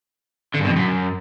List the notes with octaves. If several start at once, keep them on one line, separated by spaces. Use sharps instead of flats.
D3
G2
B2
F2
F#2